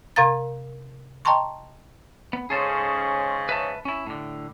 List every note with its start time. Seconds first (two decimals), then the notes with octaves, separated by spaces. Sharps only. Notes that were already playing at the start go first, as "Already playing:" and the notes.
0.16 C3 A#4 F5 A#5 A6
1.25 D#5 G5 A5 A#5 C6 C#6
2.33 B3
2.50 G#2 C#3 C#4 G#4 A4 C5
3.49 B4 E5 A5
3.85 C#4 E4
4.07 A2 D3